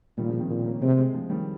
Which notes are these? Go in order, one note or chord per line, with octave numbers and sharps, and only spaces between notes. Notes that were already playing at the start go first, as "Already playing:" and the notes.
A#2 D#3 G3
C#3 F3
C3 D#3
A#2
A#3 C#4
C3 G#3 C4
G#3 C4
F3 G#3
D#3 G3